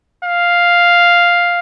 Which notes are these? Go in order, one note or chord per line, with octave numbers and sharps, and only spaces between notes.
F5